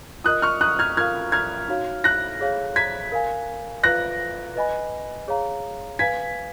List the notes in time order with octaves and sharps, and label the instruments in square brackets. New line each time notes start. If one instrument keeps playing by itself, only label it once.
[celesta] F4 A#4 D#5 [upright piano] D#6 F#6
[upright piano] C#6 F6
D#6 F#6
F6 G#6
[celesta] F4 A#4 F5 [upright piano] F6 G#6
[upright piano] F6 G#6
[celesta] D#4 F#4 C#5 F5
[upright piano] F#6 A#6
[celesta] G#4 C#5 F5
[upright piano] G#6 B6
[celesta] A#4 F5 G#5
[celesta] F4 B4 F5 [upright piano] F#6 A#6
[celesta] B4 D#5 G#5 B5
G#4 C#5 F5 A#5
[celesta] B4 F5 G#5 [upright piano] G#6 B6